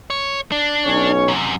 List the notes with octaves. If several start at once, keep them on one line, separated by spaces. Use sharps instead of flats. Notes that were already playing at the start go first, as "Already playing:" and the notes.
C#5
D4
B1 C#4 C#5
F#2 C3